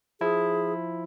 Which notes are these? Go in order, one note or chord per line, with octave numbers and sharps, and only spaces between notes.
F3 E4 G#4